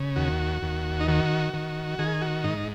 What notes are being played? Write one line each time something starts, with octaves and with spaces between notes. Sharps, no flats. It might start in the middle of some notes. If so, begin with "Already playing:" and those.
Already playing: C#3
D#2 F#4
D#2
D#4
D#3 F#4
D#3
D#3 G#4
F#4
G#2 D#4